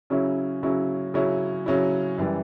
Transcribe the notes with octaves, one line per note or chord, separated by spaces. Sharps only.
C#3 F#3 C#4 E4
C#3 F#3 C#4 E4
C#3 F#3 C#4 E4
C#3 F#3 C#4 E4
F#2 E3 G3